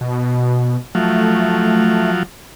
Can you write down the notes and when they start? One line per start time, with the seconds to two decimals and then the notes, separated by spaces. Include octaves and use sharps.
0.01 B2
0.95 F3 F#3 A3